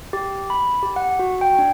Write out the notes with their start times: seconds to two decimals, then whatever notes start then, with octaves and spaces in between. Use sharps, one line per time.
0.13 G4
0.50 B5
0.83 G4
0.96 F#5
1.19 F#4
1.41 G5
1.59 D4